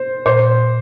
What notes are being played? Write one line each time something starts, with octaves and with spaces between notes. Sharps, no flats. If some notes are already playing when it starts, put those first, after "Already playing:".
Already playing: C5
A#2 C5